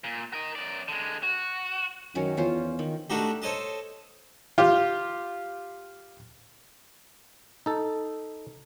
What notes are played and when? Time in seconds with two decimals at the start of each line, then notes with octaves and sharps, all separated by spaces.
0.04 A#2
0.33 A#4 D#5
0.55 F#2 D5
0.88 D3 G#3
1.23 F#4
2.15 F#2 D#3 F#3 C#4
2.37 E2 C#4 F4 C5
2.79 D#3
3.10 A3 D4 D#4 F#4 G4
3.42 A4 C5 C#5 D#5 A5
4.58 F4 G4
7.66 D#4 A4